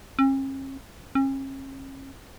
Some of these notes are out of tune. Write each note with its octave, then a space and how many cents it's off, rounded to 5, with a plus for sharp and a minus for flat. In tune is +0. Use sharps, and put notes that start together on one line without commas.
C#4 -45
C#4 -40